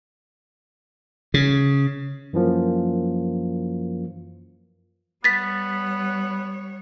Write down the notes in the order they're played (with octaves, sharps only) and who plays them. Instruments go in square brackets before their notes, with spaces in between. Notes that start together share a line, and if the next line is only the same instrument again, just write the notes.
[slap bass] C#3
[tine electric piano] F#2 E3 F3 A#3
[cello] G3 C#5 [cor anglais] B3 [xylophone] A6 B6